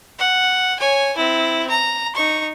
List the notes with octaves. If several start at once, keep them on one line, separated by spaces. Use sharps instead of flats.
F#5
C#5 G#5
C4 E4
A#5
D#4 C#6